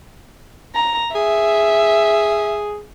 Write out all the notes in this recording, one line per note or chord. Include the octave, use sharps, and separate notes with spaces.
A#5
G#4 E5